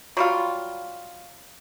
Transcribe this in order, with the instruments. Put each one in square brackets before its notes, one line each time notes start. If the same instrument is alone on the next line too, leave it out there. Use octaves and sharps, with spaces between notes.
[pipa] F#3 G3 F4